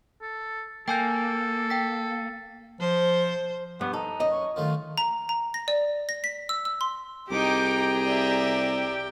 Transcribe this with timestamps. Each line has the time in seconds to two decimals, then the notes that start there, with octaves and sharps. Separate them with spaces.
0.22 A4
0.88 A#3 A4 G5 G#5 G6
1.70 G5 B6
2.81 F3 C5
3.81 G2 B3
3.93 D#4 A4
4.20 F#2 D#5
4.32 C#5
4.56 F#2 D#3 A3 F4
4.98 A#5
5.29 A#5
5.54 A#6
5.68 D5
6.09 A#6
6.24 B6
6.49 E6
6.65 E6
6.81 C6
7.31 C2 D#4 G4 G#4 G5 A#5 D6
8.03 D5 E5